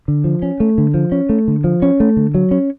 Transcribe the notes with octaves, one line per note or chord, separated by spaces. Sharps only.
D3
F3
C#4
A3
D3
F3
C#4
A3
D3
F3
C#4
A3
D3
F#3
C#4